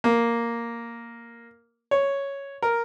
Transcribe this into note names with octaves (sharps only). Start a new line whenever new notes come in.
A#3
C#5
A#4